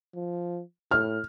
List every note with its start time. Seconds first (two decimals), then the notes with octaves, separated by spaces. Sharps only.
0.15 F3
0.91 A2 F6